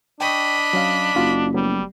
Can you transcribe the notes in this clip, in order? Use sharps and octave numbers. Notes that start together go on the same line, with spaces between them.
D4 D#5 G5 B5 C#6
F#3 C#4 F5
F#1 D#4 F4 F#4
F#3 G3 A3 B3